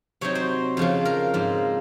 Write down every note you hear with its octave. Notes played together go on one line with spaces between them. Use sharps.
C3 F#3 C4 D#4 C#5
C5
F2 C#3 F3
A#4
G#2 F3 A#3